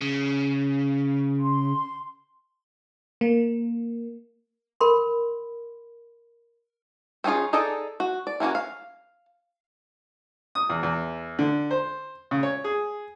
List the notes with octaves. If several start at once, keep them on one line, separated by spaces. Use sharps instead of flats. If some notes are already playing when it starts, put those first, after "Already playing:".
C#3
C6
A#3
A#4 B5 C6
C4 C#4 D#4 F4 G#4
D#4 G#4 A4 D5 D#5
F#4
D5
E3 A#3 C#4 F#4
F5
D#6
E2
E2
D3
C5
C#3
C#5
G#4